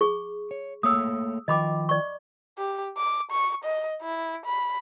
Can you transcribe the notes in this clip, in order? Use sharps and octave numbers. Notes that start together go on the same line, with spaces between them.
G#4 C#6
C#5
A3 A#3 C#5 D#6 E6
D#3 F3 D#5 G5 B5 D6
D5 C#6
G4
D6
C#6
D#5
E4
B5